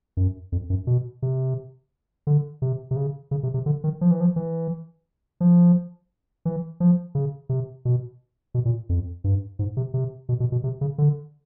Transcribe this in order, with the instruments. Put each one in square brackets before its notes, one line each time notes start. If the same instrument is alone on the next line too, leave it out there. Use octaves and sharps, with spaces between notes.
[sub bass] F#2
F2
F#2
B2
C3
D3
C3
C3
C#3
C#3
C3
C3
D3
D#3
F3
E3
F3
E3
F3
E3
F3
C#3
C3
B2
B2
A#2
F2
G2
G#2
C3
C3
B2
B2
B2
C3
C#3
D3